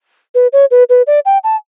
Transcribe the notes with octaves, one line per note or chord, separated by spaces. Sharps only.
B4
C#5
B4
B4
D5
G5
A5